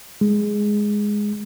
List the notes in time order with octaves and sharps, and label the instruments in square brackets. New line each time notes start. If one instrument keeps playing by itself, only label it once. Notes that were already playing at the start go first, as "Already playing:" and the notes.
[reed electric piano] G#3